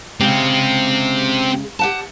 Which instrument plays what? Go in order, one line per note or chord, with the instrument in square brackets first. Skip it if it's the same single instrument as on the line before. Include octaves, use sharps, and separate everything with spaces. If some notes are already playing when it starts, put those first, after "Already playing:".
[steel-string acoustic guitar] C#3 G#3 [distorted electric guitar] C4 G4
[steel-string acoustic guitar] G4 F#5 A5